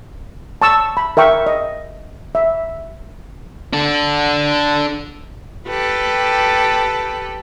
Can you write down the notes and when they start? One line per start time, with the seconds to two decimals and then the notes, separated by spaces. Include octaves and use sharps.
0.62 A5 C#6 E6
0.97 B5
1.17 A#4 E5 G5 C#6
1.46 D#5
2.35 E5
3.73 D4 A4
5.68 G4 A4 B4